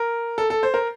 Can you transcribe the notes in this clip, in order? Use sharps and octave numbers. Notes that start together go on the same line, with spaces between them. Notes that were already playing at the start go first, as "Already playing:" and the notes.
Already playing: A#4
A4
A4
C5
A#4